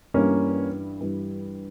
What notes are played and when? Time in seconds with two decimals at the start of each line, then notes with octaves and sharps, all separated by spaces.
0.14 G2 E3 G3 A#3 C#4
1.00 G2 E3 G3